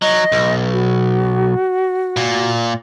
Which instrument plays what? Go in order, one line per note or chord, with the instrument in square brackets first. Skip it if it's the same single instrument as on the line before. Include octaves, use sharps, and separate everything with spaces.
[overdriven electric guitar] F#3 [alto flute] D#5
[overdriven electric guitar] B1
[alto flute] F#4
[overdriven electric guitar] A#2